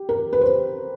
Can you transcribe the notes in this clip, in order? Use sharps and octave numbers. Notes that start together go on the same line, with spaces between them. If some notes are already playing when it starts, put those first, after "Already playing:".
Already playing: G4
A#4
B4
C5